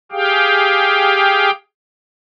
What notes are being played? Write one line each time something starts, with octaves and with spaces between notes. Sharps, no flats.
G4 G#4 F5 G5